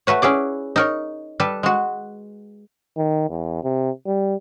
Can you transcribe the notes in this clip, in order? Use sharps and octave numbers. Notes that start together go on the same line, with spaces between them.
A3 F#4 B4 C#5
C#4 E4 G#4 D5
D#4 A#4 C#5
G3 A4 B4
G#3 F#4
D#3
E2
C3
G3